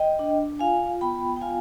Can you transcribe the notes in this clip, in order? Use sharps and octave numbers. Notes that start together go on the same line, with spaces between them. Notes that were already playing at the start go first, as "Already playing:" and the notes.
Already playing: D#5 G5
D4
F4 F5 G#5
B3 G5 B5
G5
F4 F5 G#5